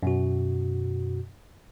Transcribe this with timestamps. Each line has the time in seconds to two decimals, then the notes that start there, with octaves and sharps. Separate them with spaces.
0.03 F#2 B2 F#4